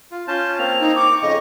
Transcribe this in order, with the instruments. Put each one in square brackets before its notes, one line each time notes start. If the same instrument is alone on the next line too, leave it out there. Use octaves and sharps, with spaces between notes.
[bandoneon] F4
[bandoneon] C#4 F4 A5 [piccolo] G6
[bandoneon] A#3 C4 [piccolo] F7
[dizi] D#4
[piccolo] C#6 [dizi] D6
[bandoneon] F2 C#3 [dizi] D#5